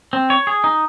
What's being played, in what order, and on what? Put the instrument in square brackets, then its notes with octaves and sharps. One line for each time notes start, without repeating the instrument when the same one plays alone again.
[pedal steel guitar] C4
C#5
G#4
D#4